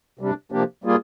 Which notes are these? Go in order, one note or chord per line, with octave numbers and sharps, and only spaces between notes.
C3 G3 D4
C3 F3 A#3 D4 G4
G3 A#3 F4 G#4